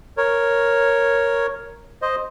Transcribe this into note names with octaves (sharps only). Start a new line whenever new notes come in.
A#4 C#5
C5 D#5